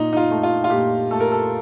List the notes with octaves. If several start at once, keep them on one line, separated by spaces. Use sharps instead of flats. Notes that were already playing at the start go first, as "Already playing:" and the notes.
Already playing: A#2 D#4
D#4
F4
A3
F4
F4
A#2 G4
A3 A4
A#4
A4